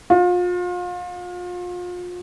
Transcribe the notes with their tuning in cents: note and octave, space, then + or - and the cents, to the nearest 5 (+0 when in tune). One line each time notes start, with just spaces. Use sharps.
F4 +35